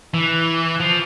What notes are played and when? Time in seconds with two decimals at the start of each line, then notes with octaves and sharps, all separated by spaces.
0.14 E3
0.80 F3